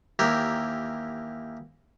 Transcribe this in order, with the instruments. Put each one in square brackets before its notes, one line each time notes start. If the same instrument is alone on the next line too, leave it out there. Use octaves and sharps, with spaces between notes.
[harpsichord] D#2 E3 G4 A#4